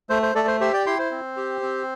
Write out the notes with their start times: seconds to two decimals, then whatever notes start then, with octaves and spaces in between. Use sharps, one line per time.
0.10 A3 C5
0.22 C5
0.35 A3 A4 D5
0.48 C5
0.61 G4 C5 E5
0.73 D5 G5
0.86 E4 G5 C6
0.99 C5
1.11 C4
1.37 G4
1.62 C4